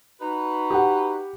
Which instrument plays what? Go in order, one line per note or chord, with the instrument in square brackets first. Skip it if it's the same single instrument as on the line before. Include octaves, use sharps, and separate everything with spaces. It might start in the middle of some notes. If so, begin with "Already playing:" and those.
[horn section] D#4 F#4 B4
[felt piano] G4 F#5